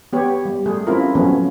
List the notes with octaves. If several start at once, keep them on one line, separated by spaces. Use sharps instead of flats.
B3 G4 C#5
G3
A3 G#4
C4 C#4 E4 F4 A#4
F3 F#3 A3 B3 C#4